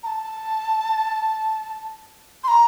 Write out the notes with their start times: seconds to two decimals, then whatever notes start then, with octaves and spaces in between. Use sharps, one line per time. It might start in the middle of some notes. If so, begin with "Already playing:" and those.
0.03 A#5
0.07 A5
2.44 C6
2.48 A#5